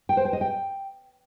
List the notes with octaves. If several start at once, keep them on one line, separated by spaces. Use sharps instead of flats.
G5
C5
G5
D#5
G5